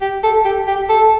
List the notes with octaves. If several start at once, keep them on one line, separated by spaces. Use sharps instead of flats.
G4
A4
G4
G4
A4